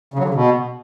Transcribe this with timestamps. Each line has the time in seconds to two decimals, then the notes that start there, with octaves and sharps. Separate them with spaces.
0.14 C#3
0.19 F#3
0.24 D3
0.29 C#3
0.34 B2